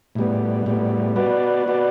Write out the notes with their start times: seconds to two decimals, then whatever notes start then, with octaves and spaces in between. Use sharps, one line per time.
0.15 A2 G3 B3
0.66 A2 G3 B3
1.16 B3 F#4 B4 D5
1.66 B3 F#4 B4 D5